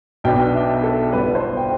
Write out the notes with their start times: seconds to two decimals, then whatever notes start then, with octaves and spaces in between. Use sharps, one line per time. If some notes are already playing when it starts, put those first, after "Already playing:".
0.24 B1 B2 B3 D4 G5
0.54 E5
0.83 A4
1.13 G1 G2 D3 B4
1.35 C5
1.57 G5